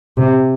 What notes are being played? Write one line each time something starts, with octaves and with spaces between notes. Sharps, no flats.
C3